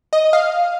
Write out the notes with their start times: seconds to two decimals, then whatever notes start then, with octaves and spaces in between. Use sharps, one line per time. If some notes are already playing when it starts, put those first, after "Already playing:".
0.13 D#5
0.33 F5